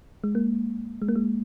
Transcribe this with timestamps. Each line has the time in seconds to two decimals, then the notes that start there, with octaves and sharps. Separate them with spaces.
0.24 G#3
0.35 A#3
1.02 G#3
1.08 A#3
1.15 G#3